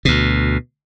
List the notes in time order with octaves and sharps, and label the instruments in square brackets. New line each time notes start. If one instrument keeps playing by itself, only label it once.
[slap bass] D2 B2